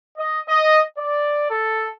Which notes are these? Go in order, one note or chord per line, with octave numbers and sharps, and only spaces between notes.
D#5
D#5
D5
A4